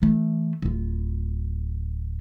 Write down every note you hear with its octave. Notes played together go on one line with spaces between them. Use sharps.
E3 A3
D1 F4